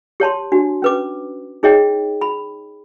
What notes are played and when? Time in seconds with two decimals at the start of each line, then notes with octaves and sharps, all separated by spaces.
0.20 G4 C#5 A5 C6
0.52 D4 F#4
0.82 C#4 B4 D6
1.63 D#4 G#4 C#5 D#5 G5
2.21 B5